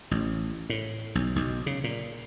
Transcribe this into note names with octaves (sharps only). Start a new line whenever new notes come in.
A1
A2
B1
B1
C#3
A#2